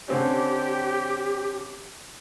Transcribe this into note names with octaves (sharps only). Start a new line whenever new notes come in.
D3 C4 C#4 G4